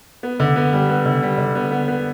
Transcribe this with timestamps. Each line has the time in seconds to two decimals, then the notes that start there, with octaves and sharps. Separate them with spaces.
0.23 B3
0.40 D3
0.56 B3
0.73 G3
0.89 B3
1.06 D3
1.22 G3
1.38 D3
1.55 B3
1.72 B3
1.88 B3